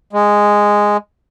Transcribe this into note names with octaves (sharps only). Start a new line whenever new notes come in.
G#3